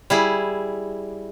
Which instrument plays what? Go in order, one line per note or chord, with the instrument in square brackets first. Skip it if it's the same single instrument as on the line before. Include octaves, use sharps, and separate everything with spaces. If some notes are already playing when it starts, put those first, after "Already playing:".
[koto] G3 E4 G#4